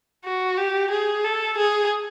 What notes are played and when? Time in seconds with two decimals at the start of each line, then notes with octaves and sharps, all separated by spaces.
0.25 F#4
0.57 G4
0.91 G#4
1.24 A4
1.58 G#4